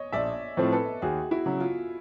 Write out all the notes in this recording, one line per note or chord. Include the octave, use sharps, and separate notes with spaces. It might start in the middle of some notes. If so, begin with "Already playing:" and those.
Already playing: C#5 D#5
A#1 D5 E5
A2 F3 A3 C4
A4 B4
D#2 F#4 G#4
E4 F#4
C#3 F#3
F4